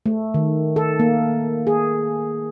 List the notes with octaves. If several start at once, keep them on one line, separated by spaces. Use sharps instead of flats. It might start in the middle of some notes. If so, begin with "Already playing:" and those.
A3
D#3
A4
A#3
G#4